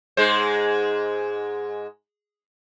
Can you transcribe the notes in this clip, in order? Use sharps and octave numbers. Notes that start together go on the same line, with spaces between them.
G#2 G#3 C5